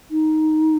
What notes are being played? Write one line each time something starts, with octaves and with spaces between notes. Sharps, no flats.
D#4